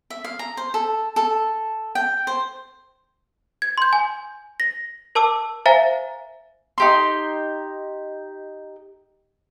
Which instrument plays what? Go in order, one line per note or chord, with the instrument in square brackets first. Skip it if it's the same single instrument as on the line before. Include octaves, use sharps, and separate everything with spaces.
[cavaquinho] E5
F5
A#5
C5
A4
A4
G5
C5
[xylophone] G#6
C6 G6
G#5
A#6
A#4 A5 D6 E6
C5 E5 F5 G#5 A#5 A6
[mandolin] D#4 G4 C6